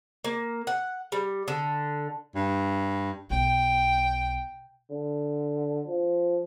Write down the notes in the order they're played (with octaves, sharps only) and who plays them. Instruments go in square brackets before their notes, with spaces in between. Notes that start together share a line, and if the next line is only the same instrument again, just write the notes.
[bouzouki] A#3
F#5
G3
D3
[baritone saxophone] G2
[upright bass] B1 [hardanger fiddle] G5
[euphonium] D3
F3